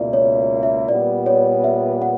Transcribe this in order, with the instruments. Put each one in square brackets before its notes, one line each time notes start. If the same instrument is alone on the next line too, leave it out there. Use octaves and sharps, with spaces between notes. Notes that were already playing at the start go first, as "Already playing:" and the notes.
Already playing: [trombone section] C#2 B2 A#3 E4 [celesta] D5
[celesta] C#5
E5
[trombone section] A#2 G3 B3 [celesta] D5
[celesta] C#5
E5
F#5